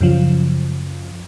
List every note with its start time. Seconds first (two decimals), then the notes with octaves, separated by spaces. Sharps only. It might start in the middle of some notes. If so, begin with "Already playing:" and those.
0.01 F#2 C#3 F3